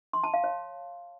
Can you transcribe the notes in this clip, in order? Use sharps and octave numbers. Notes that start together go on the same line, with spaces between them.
C6
A5
F5
C#5